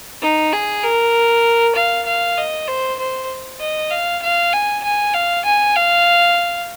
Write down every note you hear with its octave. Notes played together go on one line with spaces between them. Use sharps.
D#4
G#4
A#4
F5
F5
D#5
C5
C5
D#5
F5
F5
G#5
G#5
F5
G#5
F5